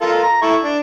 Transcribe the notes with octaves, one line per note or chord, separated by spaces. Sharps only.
F4 A4 A#4
A#5
E4 A4 C#6
D4